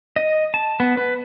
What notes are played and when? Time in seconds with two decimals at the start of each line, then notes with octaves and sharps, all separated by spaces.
0.16 D#5
0.54 A5
0.80 B3
0.97 B4